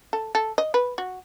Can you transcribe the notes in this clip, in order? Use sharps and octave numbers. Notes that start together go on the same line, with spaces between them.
A4
A4
D#5
B4
F#4